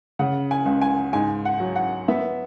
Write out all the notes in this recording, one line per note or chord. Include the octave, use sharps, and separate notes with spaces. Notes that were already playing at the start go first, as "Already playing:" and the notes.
C#3 F#5
G#5
C#2
G#5
G#2 G#5
F#5
F#3
F#5
B3 E5